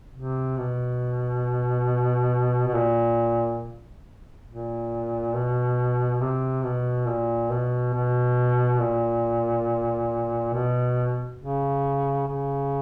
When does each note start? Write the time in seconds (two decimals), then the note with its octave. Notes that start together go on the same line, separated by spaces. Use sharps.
0.14 C3
0.58 B2
2.68 B2
2.75 A#2
4.48 A#2
5.35 B2
6.21 C3
6.64 B2
7.08 A#2
7.51 B2
7.94 B2
8.81 A#2
10.54 B2
11.40 C#3
12.28 C#3